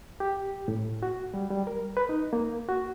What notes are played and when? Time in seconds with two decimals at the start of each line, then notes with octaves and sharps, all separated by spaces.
0.20 G4
0.68 A2
1.03 F#4
1.34 G3
1.51 G3
1.67 A#4
1.97 B4
2.09 D#4
2.33 A#3
2.68 F#4